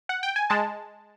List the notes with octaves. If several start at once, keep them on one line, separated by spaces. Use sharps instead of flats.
F#5
G5
G#5
G#3 A5